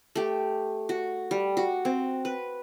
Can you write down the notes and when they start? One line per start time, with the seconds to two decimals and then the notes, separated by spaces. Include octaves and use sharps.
0.15 A3 G4
0.89 F#4
1.31 G3
1.57 F#4
1.85 C4
2.25 B4